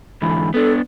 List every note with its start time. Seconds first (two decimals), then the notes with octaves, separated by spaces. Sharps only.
0.22 G#2 D3 E3 B5
0.54 B3 D4 A4